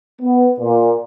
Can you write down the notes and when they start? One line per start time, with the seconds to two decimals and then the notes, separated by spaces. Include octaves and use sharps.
0.22 B3
0.59 A#2